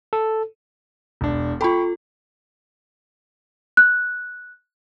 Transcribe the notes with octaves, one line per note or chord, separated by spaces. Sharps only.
A4
E1 D4
F4 A4 G5 B5 C#6
F#6